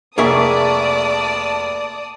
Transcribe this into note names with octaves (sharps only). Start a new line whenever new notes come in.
F1 A#3 G#4 D5 E5 A5 C#6 D#6